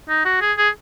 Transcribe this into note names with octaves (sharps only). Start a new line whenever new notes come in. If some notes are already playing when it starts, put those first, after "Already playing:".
D#4
F#4
G#4
G#4